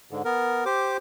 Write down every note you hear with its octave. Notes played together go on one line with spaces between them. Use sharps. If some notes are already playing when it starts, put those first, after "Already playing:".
G#2 D3
B3 A#4
G4 C5 D6